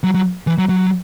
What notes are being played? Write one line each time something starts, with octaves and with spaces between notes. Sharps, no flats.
F#3
F#3
E3
F#3
F#3